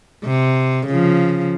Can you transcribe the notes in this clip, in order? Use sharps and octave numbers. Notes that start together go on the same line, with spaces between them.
C3
C#3 F3